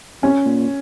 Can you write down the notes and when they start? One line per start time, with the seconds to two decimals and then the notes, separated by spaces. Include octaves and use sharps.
0.23 C3 C#4
0.46 A#2